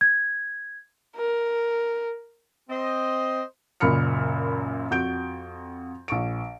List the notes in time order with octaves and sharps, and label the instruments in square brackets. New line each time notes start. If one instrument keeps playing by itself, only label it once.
[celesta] G#6
[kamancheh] A#4
[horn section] C4 C5 D#5
[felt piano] F#1 F#2 A#2 B5 F6 C#7
F2 F#4 G6 D7
A#1 C#6 D7